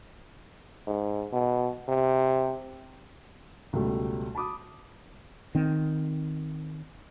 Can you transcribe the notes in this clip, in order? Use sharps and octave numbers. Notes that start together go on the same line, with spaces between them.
G#2
B2
C3
C#2 B2 F#3 G3 A3
A5 B5 D6 D#6
D#3 C4